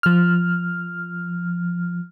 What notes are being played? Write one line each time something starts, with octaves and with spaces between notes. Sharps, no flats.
F3 F6